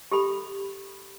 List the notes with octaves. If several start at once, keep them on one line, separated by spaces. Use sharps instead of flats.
G4 A4 B5